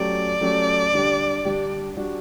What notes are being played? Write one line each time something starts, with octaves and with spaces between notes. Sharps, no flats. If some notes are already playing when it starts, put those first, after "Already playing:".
Already playing: F#3 A3 C#4 G4 D5
F#3 A3 C#4 G4
D3 G3 D4 G4
D3 G3 D4 G4
G3 D4 F#4